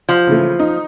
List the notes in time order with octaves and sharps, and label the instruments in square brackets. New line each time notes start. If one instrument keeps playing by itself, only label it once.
[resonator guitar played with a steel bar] F3
[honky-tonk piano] C#3 E3 A3
D#4